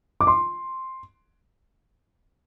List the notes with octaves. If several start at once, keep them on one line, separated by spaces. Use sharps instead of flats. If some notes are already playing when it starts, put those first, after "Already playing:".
D6
C6